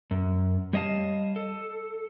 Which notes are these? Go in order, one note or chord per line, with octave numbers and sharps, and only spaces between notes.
F#2
G3 C#5 D#5 F5 A5
A4